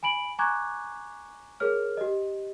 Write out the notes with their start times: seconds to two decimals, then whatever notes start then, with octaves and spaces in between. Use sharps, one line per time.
0.03 G#5 B5 D7 F#7
0.39 G#5 A#5 C#6 D6 F#6 G#6
1.60 G#4 A#4 C#5 F6
1.97 G4 D#5